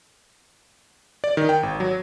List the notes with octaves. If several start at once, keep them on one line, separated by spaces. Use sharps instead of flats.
D5
D#3
G5
G#1
F#3